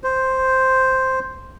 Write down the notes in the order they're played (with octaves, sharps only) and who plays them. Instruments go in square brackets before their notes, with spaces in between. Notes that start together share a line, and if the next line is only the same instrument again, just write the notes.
[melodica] C5